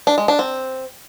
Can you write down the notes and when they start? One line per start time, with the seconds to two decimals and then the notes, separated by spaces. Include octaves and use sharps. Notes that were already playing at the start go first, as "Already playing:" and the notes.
0.07 D4
0.18 G#3
0.28 D4
0.39 C4